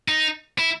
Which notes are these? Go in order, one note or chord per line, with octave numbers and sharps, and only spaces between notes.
D#4
E4